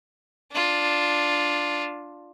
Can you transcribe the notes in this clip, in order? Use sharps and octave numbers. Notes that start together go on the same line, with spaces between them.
D4 F4